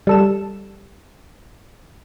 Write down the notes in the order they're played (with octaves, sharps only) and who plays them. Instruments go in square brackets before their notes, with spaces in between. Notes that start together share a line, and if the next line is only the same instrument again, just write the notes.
[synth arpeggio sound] G3 A4 E7